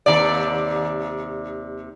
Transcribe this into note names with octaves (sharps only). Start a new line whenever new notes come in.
D#2 C3 D5